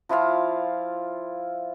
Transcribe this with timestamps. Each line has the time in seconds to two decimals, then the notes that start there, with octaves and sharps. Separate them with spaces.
0.09 F3 E4 F4 F5